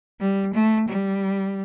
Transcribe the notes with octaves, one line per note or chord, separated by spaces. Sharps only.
G3
A3
G3